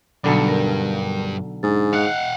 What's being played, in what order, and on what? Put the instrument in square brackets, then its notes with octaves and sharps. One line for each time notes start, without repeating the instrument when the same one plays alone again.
[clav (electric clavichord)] B1 D3 D5 [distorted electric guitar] G2 [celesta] B5 C#7
[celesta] A#4 A#6
[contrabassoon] G#2 [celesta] D4 G#5 A6
[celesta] D#5 F#6 C#7 [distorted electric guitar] F5 F#5